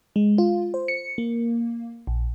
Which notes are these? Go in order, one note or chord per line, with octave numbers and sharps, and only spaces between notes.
G#3
F4
C5
C#7
A#3
A#1